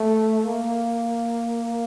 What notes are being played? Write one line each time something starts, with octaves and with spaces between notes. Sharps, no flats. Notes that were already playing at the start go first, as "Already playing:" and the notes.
Already playing: A3
A#3